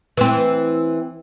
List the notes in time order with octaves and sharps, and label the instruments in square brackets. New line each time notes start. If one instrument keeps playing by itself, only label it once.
[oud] E3 C4